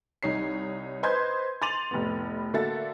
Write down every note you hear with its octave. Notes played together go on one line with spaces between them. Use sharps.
C2 D#4 C#5 C7
B4 C5 D#5 C6 G6 G#6
C6 D6 A6 D#7 F7 F#7
F1 A2 B3
D3 A#3 F#4 A4 E5 A6